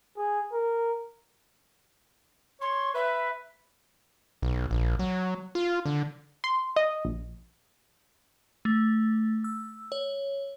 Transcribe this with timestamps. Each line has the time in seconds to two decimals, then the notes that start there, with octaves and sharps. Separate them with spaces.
0.17 G#4
0.53 A#4
2.61 C#5 C6
2.94 B4 E5
4.42 B1
4.71 A#1
4.99 F#3
5.55 F4
5.86 D3
6.44 C6
6.76 D#5
7.05 A#1
8.65 A3
9.44 E6
9.92 C#5